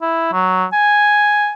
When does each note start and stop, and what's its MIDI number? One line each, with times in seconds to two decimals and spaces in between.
0.02 0.30 64
0.32 0.65 54
0.73 1.53 80